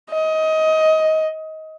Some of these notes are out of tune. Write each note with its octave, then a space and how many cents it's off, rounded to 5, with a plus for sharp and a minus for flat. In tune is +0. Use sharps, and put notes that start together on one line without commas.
D#5 +20